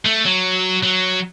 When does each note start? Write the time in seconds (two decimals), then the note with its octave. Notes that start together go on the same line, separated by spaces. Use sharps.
0.05 A3
0.25 F#3
0.83 F#3